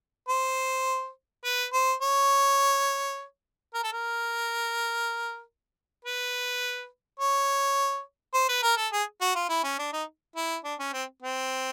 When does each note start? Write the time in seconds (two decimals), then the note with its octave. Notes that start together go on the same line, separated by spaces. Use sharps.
0.29 C5
1.45 B4
1.73 C5
2.02 C#5
3.74 A#4
3.84 A4
3.93 A#4
6.05 B4
7.20 C#5
8.34 C5
8.49 B4
8.63 A#4
8.77 A4
8.93 G#4
9.21 F#4
9.36 F4
9.49 E4
9.64 C#4
9.79 D4
9.93 D#4
10.36 E4
10.64 D4
10.79 C#4
10.93 C4
11.23 C4